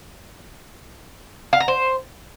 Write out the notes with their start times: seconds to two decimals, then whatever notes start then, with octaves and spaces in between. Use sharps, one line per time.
1.53 F5
1.60 A#5
1.68 C5